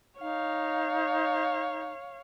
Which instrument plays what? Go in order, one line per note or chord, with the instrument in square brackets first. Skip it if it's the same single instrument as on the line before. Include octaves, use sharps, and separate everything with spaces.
[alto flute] D#4 [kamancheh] C#5 F5